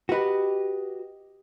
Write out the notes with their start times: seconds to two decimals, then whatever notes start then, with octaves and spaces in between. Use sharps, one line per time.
0.09 F#4 G4 B4 D#5